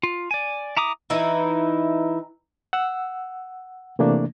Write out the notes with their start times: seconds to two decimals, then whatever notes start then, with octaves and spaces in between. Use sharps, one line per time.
0.03 F4
0.31 D5 G#5
0.77 E4 A#5 D6 D#6
1.10 E3 D#4 E4
2.73 F#5 E6
3.99 C3 E3 A3 A#3 D4